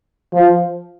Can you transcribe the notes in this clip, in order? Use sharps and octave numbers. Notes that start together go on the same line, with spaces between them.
F3